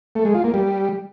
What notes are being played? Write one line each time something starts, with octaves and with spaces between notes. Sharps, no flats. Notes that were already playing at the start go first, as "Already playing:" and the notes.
A3
G#3
F4
A#3
G3